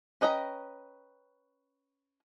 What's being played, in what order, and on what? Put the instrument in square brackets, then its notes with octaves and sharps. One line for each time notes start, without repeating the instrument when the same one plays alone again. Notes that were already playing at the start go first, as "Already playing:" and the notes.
[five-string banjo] C#4 B4 D#5 G5 A#5